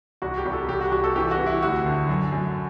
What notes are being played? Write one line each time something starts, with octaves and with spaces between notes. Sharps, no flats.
C2 F#4
G4
C2
A4
C2 G4
F#4
C2 F#4
A4
E3 G4
F#4
E3
E4
D2 F#4
D3
F#2
F#2